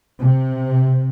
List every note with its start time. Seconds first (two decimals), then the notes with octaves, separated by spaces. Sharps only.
0.21 C3